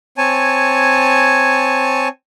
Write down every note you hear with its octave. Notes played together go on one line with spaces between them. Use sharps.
C4 C#5 G#5 A5